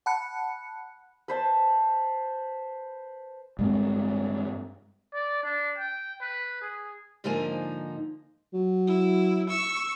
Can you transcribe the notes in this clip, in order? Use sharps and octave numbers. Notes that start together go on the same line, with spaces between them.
F#5 A5 B5 F#6 C#7
B4 C5 A5
G2 G#3 C4
D5
D4
G5
B4
G#4
G#2 D3 F3 A#3 D#4 G#5
F#3
E4
C#6 E6